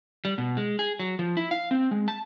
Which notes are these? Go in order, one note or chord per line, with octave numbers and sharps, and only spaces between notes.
G3
B2
G#3
G#4
F#3
F3
E4
F5
C4
G#3
A5